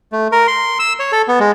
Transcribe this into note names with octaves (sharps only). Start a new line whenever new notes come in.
A3
A#4
C6
E6
C#5
A4
B3
G#3